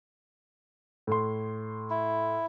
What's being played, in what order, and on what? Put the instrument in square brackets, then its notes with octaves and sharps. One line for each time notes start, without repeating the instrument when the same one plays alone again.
[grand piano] A2 C6
[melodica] E4